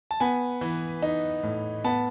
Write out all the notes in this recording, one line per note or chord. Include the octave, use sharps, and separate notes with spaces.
A5
B3 G#5
E3
D#4
A2
B3 A5